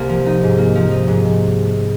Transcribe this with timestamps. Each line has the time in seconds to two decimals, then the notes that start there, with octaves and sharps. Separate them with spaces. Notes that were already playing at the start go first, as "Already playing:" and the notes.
Already playing: C2 A#3
0.09 F3
0.26 D#4
0.43 G#2
0.58 A#3
0.75 F3
0.91 D#4
1.08 G#2